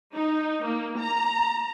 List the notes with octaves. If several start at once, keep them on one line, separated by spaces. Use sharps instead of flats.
D#4
A#3
A#5